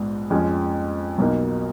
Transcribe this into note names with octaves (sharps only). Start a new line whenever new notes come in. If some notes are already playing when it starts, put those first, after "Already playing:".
Already playing: A#1 G#2 B3
F2 F3 G#3 C#4
B1 B2 A#3 D#4